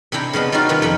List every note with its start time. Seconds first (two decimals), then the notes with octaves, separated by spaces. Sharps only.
0.12 C3 C4 D4 E4 G5 A#5
0.33 C#3 G#3 B3 D4
0.52 G3 C#4 D#4 F4 F#4
0.69 C3 D#3 F4 B4
0.82 F2 C#4 G5 B5